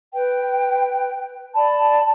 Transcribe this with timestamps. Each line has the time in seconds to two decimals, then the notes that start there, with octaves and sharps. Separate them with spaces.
0.13 B4 G5
1.54 D5 A5 B5